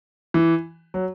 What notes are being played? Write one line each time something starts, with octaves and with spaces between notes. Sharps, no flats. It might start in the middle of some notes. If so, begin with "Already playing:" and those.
E3
F#3